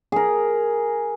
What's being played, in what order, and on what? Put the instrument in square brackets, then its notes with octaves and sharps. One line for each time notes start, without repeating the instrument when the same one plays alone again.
[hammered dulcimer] G#4 A#4